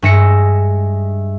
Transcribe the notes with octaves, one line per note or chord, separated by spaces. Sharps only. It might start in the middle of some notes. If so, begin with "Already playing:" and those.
G2 G#3 E5 A#6 C#7